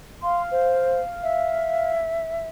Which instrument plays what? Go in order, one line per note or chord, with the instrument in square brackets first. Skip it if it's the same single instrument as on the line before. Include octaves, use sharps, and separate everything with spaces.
[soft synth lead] F5 [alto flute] C6
[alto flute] C5
E5